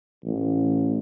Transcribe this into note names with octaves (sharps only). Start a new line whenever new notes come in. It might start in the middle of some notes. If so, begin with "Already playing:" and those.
A1